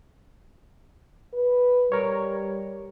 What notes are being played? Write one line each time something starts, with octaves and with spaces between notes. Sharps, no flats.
B4
G3 A#4 C#5